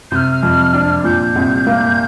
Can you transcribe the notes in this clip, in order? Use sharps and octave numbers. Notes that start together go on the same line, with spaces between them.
C3 F6 G6
F2
D4
A#2 G6
C2
A#3